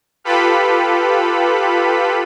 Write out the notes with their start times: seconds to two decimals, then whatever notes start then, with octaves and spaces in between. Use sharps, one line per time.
0.24 F4 G4 A4 B4 B5